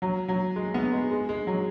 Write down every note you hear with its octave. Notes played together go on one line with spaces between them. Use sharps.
F#3
F#3
G#3
B3
G#3
G#3
G#3
F#3